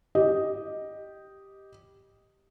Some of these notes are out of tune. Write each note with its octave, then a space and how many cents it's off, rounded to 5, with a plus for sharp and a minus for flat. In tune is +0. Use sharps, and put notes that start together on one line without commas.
G4 +0 D#5 +0